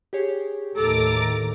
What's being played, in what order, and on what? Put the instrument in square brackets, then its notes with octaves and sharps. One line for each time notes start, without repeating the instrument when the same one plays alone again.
[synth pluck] G4 G#4 C#5
[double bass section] D#2 A2 D#3 [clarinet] A4 [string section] A#5 D6